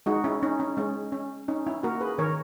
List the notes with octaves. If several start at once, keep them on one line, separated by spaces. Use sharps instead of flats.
G#3 D#4 F#4
C#4 E4
C#4 D#4
C#4
G#3 C#4
C#4
C#4 D#4
C#4 E4
A#3 F#4 A#4
G#4 B4
D#3 A#4 C#5